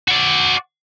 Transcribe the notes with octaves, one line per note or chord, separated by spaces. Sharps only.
F#4 D5